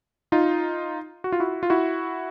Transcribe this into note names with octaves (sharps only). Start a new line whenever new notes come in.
D#4 F4
F#4
F4
E4 F#4
F4
E4 F#4